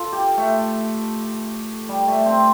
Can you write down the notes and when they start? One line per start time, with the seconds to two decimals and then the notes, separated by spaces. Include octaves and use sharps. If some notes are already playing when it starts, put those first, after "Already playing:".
Already playing: F4 A4
0.13 G4
0.37 A3
1.89 G3
2.07 A3
2.26 C4